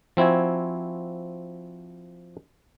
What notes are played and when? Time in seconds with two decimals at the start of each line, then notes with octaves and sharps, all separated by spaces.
0.17 F3 C4 E4 F#4 G#5